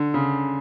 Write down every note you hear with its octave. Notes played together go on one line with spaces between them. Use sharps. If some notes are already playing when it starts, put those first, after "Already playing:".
Already playing: D3
C#3